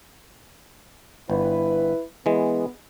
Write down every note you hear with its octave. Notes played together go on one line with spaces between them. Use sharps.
G1 E4 B4
E3 G#3 B3